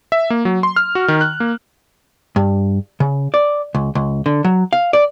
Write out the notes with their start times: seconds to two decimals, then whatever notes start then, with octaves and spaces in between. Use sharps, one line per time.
0.12 E5
0.30 A#3
0.45 F#3
0.63 C6
0.76 F6
0.95 F#4
1.08 D#3
1.21 F#6
1.40 A#3
2.36 G2
3.00 C#3
3.34 D5
3.75 C#2
3.95 C#2
4.26 D3
4.44 F#3
4.73 F5
4.93 D5